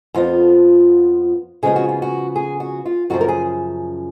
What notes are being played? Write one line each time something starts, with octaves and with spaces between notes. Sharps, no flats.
F2 F3 B3 F4
C#3 F3 G#3 B3 G#4
F#4
F4
F#4
G#4
F#4
F4
F#2 C#3 F3 F#4
A#4
G#4